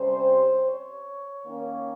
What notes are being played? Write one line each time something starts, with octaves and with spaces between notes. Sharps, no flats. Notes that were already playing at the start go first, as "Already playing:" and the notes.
Already playing: C3 G3 C#4 C5
C#5
D#3 A#3 C#4